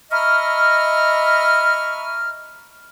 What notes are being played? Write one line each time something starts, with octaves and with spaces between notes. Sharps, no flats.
D#5 E5 A#5 B5 C#6 F6